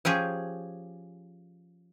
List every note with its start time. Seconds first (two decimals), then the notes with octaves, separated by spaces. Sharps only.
0.05 F3 C#4 G4 G#4